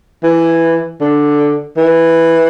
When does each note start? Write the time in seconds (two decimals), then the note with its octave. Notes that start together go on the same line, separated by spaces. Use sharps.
0.24 E3
1.01 D3
1.77 E3